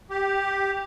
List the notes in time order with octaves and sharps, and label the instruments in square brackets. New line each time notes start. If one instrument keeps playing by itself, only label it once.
[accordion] G4